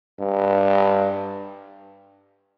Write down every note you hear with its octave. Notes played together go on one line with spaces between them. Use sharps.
G2